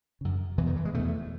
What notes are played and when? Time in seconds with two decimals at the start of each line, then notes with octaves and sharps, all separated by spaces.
0.21 F#2 C#3
0.58 E2 B2 E3
0.67 D#3
0.76 E3
0.85 G#3
0.94 E2 B2 A3